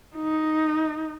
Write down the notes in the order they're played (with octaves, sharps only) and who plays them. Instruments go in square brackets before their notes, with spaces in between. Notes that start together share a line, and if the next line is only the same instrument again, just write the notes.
[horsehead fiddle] D#4